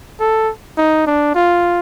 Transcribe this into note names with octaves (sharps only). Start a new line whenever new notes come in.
A4
D#4
D4
F4